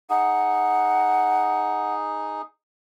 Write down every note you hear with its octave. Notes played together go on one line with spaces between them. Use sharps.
D#4 G#4 F#5